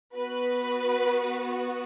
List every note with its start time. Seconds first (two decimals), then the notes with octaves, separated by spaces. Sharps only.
0.14 B3 F#4 B4